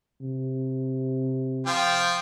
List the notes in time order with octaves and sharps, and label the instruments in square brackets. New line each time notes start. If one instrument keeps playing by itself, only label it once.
[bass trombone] C3
[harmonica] F3 F4 G5